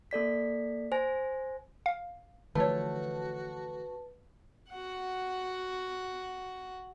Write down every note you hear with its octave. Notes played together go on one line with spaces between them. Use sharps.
A#3 A4 D5 B6
C5 G#5 A#6
F5
D3 E3 F3 A3 F#4 B4 C#5 A5
F#4 F#5